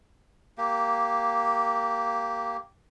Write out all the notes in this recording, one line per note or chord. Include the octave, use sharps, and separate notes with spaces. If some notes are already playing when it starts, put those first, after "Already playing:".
A#3 G4